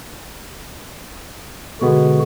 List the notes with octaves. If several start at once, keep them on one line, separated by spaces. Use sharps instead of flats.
B2 D3 G#3 B3 F#4